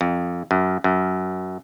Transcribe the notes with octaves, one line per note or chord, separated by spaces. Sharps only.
F2
F#2
F#2